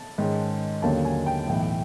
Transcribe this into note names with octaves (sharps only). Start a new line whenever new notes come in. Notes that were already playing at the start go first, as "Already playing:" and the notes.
Already playing: A5
G#2 D#3 G#3 C#4
D#2 D3 F#3 A#3 C#4 A5
G#5
G5
B1 A2 E3